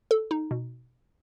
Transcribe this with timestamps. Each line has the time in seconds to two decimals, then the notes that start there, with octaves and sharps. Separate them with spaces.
0.11 A4
0.31 D#4
0.51 B2